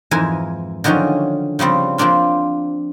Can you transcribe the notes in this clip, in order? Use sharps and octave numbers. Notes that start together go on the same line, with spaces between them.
F2 G#2 E3 A#4 E5 G#5
D3 D#3 F3 F#3 C#4
C#3 F3 G3 C4
F3 A#3 C4 D4 F4